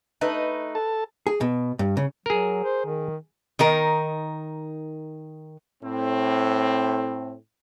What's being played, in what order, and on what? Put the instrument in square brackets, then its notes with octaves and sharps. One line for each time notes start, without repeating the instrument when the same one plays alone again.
[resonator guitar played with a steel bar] A3 D#4 [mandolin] B4
[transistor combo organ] A4 A5
[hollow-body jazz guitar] G#4
B2
G2
C#3
[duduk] F#3 [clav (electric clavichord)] G#4 A#4
[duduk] C5
D#3
[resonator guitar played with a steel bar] D#3 D#4 A#4
[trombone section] A2 C4